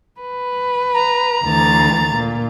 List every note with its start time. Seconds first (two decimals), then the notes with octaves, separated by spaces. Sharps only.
0.20 B4
0.94 A#5
1.43 D2 E3 A6
2.13 A#2